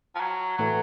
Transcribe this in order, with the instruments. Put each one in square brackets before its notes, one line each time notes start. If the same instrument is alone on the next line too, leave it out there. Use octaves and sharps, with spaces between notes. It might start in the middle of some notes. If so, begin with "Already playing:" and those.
[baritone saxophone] F3
F#3
[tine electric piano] A2 E3 A3 [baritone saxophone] F#3